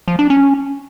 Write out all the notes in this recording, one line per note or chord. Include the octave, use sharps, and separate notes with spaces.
F3
D4
C#4